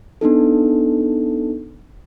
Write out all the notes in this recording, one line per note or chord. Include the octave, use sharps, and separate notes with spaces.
B3 D4 D#4 A4